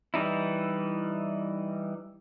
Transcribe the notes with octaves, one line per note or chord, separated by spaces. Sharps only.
E3 G3 D#4 E4